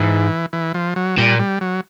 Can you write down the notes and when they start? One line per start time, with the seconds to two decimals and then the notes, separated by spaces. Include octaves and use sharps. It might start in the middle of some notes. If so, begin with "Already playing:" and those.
Already playing: G#2 E3
0.53 E3
0.74 F3
0.96 F#3
1.18 A#2 G3
1.39 G3
1.61 F#3